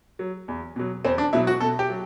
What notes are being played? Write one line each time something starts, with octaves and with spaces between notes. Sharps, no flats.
F#3
E2
B2 F#3
E2 C4
D4
B2 F#3 E4
F#4
B2 A4
G4
F#3